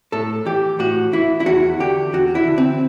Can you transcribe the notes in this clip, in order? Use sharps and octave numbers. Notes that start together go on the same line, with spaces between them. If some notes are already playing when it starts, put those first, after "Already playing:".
A2 A4
E3 G4
A2 F#4
E3 E4
E4
E2 F#4
D3 G4
E2 F#4
E4
D3
C4